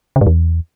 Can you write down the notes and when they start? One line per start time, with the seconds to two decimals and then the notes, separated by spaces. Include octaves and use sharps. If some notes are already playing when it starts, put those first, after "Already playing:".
0.16 C#3
0.21 G#2
0.27 E2